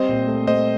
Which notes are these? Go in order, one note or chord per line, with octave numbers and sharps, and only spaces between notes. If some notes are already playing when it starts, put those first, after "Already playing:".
Already playing: G3 C4 C5 D#5
A#2
A3
A3 C5 D#5